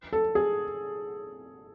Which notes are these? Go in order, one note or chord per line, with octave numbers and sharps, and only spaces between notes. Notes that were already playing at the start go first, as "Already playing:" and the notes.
A4
G#4